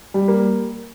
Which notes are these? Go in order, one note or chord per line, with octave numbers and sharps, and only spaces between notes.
G3
A#3